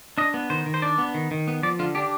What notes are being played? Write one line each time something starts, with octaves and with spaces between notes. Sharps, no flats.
D4 D#5
B3
D#3 C5
D#3
C5
D4 D5
B3
D#3
D#3
B3
F3 D5
D3 F4
D4 G4